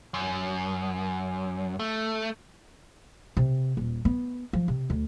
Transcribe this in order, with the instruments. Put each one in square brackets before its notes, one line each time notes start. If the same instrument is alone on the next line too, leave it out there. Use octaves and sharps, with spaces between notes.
[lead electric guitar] F#2
A3
[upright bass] C3
D#1
B3
F3
C3
D2